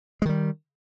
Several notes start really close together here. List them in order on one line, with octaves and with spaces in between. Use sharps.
G#3 D#3 G3